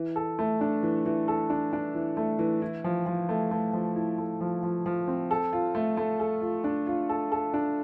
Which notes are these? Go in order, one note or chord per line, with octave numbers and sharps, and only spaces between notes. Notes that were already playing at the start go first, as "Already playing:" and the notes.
Already playing: E3
A4
A3
D4
E3
E3
A4
D4
D4
E3
A3
E3
E4
F3
F3
A3
A3
F3
E4
A3
F3
F3
F3
C4
A4
F4
A3
A3
A4
F4
D4
F4
A4
A4
D4